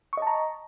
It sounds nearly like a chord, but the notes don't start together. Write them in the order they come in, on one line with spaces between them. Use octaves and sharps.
C#6 D#5 A5 A#5